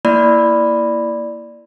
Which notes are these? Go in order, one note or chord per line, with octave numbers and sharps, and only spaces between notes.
A#3 E4 D5 B5